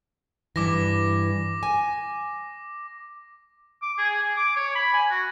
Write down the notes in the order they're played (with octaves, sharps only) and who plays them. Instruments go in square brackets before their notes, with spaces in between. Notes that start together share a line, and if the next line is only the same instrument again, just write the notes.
[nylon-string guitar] G2 E3 [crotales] D6 A#6
[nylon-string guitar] G#5
[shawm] D6
G#4
G#4
D6
C#5
B5
G#5
F#4